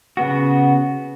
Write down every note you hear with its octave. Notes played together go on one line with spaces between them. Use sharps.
C#3 B3 F#4